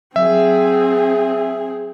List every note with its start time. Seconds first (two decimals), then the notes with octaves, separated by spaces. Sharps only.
0.16 F#3 C4 G#4 E5